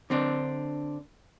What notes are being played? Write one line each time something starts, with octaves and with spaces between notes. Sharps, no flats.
D3 C4 D4